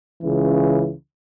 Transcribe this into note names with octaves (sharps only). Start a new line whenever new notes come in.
C#2 C#3 E3